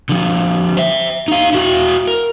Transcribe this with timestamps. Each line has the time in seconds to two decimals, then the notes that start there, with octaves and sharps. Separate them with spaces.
0.09 D3 F3
0.77 C5 E5
1.28 D#4 F5
1.53 E4 F#4
2.07 A#4